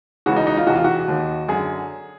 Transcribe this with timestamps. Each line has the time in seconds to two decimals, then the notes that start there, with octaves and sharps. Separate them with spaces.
0.26 C#2 C#3 E3 F#4
0.36 D#4
0.47 D#4
0.57 F4
0.67 E2 C3 E3 F#4
0.76 F4
0.84 F#4
1.08 D#2 D#3
1.49 F#2 D3 G#4